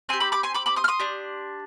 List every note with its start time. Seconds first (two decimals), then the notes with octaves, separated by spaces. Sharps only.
0.09 C4 G#5 C6
0.13 G4
0.20 B5 D6
0.32 B5 D6
0.43 G#5 C6
0.54 B5 D6
0.66 B5 D6
0.76 C6 D#6
0.84 F6
0.88 C6 D#6
1.00 D4 G4